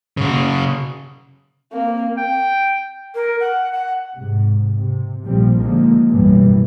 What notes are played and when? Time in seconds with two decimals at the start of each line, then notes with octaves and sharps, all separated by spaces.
0.17 C#3 F#4
1.73 A#3 C4
2.18 G5
3.15 A#4
3.40 F#5
3.72 F#5
4.15 G#2 C3
4.75 C3
5.24 A#1 A#2 F3 G3 C4
5.56 D3 D#3 F3 G#3 A#3
6.09 B1 F#2 A2 E3 G3